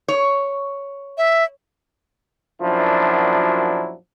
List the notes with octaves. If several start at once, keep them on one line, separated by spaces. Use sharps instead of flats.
C#5
E5
F#2 A#2 F3 F#3 D4 E4